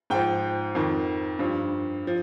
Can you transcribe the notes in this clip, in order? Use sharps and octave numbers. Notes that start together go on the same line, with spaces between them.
G#2 F3 G5
F2 D#3
G2 F3
F3